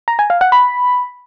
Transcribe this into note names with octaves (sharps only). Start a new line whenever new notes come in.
A#5
G#5
F5
F#5
B5